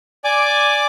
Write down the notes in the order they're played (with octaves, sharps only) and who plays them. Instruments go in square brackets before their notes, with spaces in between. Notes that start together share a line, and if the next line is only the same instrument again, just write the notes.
[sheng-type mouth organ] D5 G#5 D6